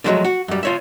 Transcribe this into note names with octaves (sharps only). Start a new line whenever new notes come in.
D3 F3 F#3 G#3 A3
F#4
F#2 G3
F4 C#5 E5